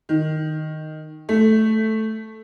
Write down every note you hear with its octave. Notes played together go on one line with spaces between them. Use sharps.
D#3
A3